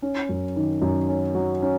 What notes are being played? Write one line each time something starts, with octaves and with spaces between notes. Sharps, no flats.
C#4
F#2
D#3
F#2
C#4
F#3
C#4